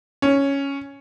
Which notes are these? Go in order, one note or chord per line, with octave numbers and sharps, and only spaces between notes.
C#4